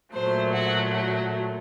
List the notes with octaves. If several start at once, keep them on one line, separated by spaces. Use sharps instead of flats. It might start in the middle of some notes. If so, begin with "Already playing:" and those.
A#2 F#3 A3 C5
F#4
F#4